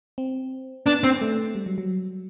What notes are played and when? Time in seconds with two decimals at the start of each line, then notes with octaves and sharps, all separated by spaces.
0.18 C4
0.86 B3 D4
1.04 C4
1.21 A3
1.55 G3
1.66 F#3
1.78 F#3